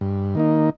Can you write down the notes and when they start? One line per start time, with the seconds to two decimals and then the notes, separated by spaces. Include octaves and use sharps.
0.01 G2
0.35 D#3 A#3 D#4